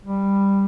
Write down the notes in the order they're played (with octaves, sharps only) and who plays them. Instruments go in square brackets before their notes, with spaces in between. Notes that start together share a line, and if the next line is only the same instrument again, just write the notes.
[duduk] G3